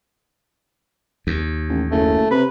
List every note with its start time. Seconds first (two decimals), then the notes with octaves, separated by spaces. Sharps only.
1.27 D#2
1.69 A1
1.91 F#1 A3
2.31 C3 B4